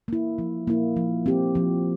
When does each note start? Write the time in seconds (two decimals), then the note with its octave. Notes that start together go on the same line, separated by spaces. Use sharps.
0.08 A#3 E4
0.38 F3
0.67 A#3 E4
0.97 F3
1.26 C4 G4
1.55 F3